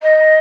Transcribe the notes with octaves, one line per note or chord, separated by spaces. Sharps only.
D#5